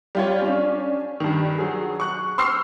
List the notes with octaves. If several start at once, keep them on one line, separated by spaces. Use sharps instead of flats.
G3 F4 C#5
C#4 D4
G2 D#3
F#3 G#4
C#6 F#6
C6 C#6 E6 F6 C7